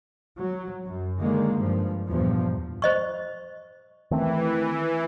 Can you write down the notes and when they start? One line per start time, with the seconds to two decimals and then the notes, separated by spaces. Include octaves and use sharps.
0.41 F#3
0.84 F#2
1.20 D3 D#3 G#3 A#3
1.55 G2 F3
2.09 E2 G2 A#2 F3
2.82 C5 D#5 C#6
4.11 D#3 E3 A3 C4